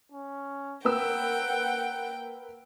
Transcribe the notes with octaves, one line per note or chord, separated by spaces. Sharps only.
C#4
A#3 B4 F#5 G5 E6